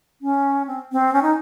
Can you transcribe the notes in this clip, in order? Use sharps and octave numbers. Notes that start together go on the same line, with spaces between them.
C#4
C4
C4
C#4
D#4